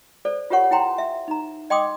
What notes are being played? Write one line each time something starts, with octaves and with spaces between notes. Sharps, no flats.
A4 C5 D5
F4 G4 A#4 C#5 F#5 C#6
E4 G5 A#5 C6
E5
D#4 A#5
D#5 G5 C6 D6 D#6